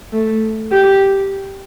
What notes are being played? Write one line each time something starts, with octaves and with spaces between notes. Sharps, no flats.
A3
G4